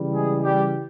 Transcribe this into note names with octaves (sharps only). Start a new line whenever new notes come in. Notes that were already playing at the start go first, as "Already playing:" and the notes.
Already playing: C#3 E3 G3
G#3 G#4
G3 G4